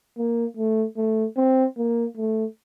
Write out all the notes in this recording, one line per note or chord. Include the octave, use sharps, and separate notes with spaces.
A#3
A3
A3
C4
A#3
A3